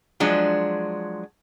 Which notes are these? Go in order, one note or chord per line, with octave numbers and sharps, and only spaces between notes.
F3 F#3 G#3 D4